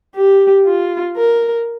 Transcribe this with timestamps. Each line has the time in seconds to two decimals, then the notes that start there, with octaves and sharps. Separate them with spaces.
0.15 G4
0.65 F4
1.16 A#4